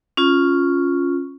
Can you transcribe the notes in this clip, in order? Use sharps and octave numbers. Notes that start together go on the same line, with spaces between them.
C#4 F4